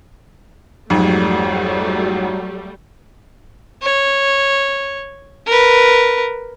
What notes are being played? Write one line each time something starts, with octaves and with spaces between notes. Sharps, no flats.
F2 G#2 F#3 G3 A3
C#5
A#4 B4